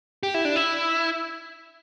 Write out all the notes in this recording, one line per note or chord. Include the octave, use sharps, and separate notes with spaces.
G4
E4
D4
E4